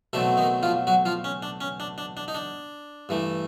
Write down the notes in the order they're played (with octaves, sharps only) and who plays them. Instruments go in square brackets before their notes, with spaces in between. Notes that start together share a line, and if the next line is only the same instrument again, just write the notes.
[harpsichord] B1 B2 F#3 A3 C4 A4
D#3 D#4
F3 F4
F#3 F#4
F3 F4
C#4
D4
C#4
D4
D4
D4
D#4
D4
G2 E3 A3